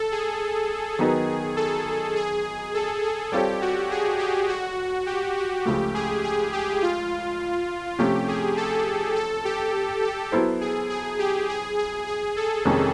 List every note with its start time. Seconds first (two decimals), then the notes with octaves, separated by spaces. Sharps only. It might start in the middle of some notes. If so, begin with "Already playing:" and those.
Already playing: A4
0.12 G#4
0.99 D#3 F#3 B3 D#4
1.57 A4
2.16 G#4
2.74 A4
3.03 G#4
3.32 G3 C4 F4 G4 A4 C#5
3.62 F#4
3.91 G#4
4.19 G4
4.49 F#4
5.06 G4
5.37 F#4
5.65 C#2 C#3 F3 A3 G4
5.94 G#4
6.24 G#4
6.53 G4
6.82 F4
7.99 C3 F3 A3 C#4 G4
8.28 G#4
8.57 A4
9.16 A4
9.45 G4
10.02 A4
10.32 F#3 B3 E4 A4 C5
10.61 G#4
10.90 G#4
11.19 G4
11.49 G#4
11.78 G#4
12.07 G#4
12.36 A4
12.65 F2 C3 D#3 G#3 C#4